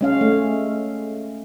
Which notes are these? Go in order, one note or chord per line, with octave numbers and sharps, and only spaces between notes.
G#3 C#4 F5
A3